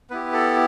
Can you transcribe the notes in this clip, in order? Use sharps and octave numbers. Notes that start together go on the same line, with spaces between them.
B3 E4 G4 B4
A4